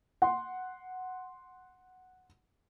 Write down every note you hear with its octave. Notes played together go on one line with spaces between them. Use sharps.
F#5 C6